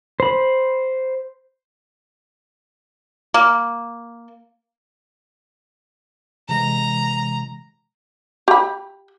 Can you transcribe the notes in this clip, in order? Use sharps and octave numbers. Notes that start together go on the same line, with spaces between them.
C5 B5
A#3
C3 E3 G#3 A#5
G4 B5